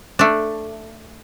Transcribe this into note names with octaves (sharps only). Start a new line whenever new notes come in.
A3 D4